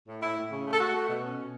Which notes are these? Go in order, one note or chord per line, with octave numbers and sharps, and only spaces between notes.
A2
A2 E4
A2
C#3
A3
A4
A3 F#4
A3
B2
C#4
B2